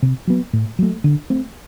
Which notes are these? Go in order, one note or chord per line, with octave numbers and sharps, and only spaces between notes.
C3
F#3 B3
A2
F#3 A3
D3
A3 C4